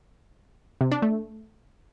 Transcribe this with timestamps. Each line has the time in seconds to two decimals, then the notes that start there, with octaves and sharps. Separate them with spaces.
0.81 C3
0.92 D4
1.02 A3